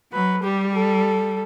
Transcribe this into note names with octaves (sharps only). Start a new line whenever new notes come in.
F#3 B4
G3 G4
A4